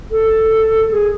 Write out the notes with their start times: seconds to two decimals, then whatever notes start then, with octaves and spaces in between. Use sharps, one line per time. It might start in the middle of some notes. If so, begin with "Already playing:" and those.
0.11 A4
0.91 G#4